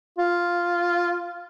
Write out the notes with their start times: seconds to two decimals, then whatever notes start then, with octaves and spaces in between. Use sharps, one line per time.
0.18 F4